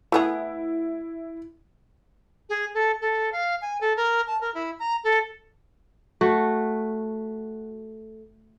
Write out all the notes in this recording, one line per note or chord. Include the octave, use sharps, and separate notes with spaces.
A3 B3 E4 G#4
G#4
A4
A4
F5
G#5
A4
A#4
A5
A#4
E4
A#5
A4
A3 F#4